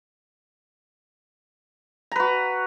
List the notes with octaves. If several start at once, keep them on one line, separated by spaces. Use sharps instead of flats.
F#4 B4 A#5